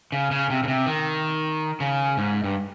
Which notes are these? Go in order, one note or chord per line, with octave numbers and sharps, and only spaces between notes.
C#3
C#3
C3
C#3
C3
D#3
C#3
G#2
G2